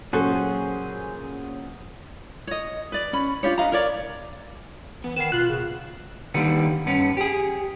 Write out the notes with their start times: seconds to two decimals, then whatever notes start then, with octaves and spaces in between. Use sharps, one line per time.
0.13 A#2 C#3 F#3 C#4 F#4 G#4 A4 C5
2.47 C#5 D#5
2.92 B4 D5
3.13 C#4 B5
3.43 D4 F4 G4 C#5
3.58 B4 D#5 F5 A#5
3.72 A#4 C#5 D5
5.04 E3 B3
5.16 D#3 B4 F#5 C7 E7
5.32 B2 F4 F#6
5.49 C#3
6.34 D#2 D3 D#3 G3 B3
6.86 G2 B3 C#4
7.17 G4 G#4